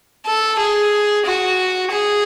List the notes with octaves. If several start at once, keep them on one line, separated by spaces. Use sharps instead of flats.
A4
G#4
F#4
G#4